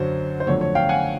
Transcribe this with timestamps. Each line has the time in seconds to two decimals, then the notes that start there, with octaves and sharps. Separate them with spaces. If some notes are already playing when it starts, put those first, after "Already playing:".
Already playing: F#2 D3 F#3 C5
0.40 C5
0.47 F2 D3 F#3 A3 C#5
0.61 C#5
0.75 F5 G5
0.89 F#5 G#5